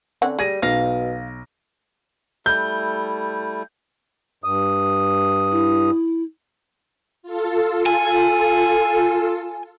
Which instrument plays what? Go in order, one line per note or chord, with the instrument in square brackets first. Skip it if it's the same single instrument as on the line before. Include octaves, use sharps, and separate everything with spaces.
[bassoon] D3 [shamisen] C4 C#4 F#5
[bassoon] G3 [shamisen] G#4 [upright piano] A#6 D#7
[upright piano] B1 A#6 [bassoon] B2 [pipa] F5
[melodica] G3 A3 E4 [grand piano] G6
[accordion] G2 D#6
[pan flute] E4
[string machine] F4 A4
[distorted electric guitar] G#5